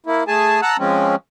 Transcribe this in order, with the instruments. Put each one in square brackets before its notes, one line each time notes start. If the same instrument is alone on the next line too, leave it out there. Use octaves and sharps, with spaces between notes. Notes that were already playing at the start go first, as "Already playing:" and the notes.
[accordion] A#3 E4
A3 G#4 G#5 A5
F#5 A5 A#5 E6 F#6
F3 G#3 C4 C#4